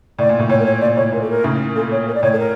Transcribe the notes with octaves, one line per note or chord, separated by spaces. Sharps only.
A2 D5
A#2
A2
A2 C#5
A#4
C#5
A#2 D5
A2 C#5
A#2 A#4
A4
A#4
A2 C#3
A#2 A4
C#5
A#4
D5
A2 C#5
A4
A#4